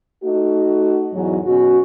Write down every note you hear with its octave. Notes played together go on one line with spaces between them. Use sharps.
A3 D#4 F#4
E2 G#2 F#3
B2 C#4 F#4